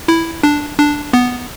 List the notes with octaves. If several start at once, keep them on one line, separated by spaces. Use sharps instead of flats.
E4
D4
D4
B3